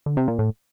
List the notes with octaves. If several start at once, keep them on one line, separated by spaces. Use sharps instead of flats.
D3
C3
A#2
A2